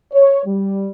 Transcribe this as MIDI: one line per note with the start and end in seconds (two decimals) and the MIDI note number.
0.13 0.43 73
0.46 0.90 55